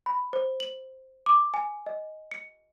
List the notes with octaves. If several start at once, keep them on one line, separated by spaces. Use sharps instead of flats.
B5
C5
F#7
D6
G#5
D#5
C#7